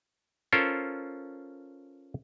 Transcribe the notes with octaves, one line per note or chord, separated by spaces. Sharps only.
C#4 F4 A4 A#4 C5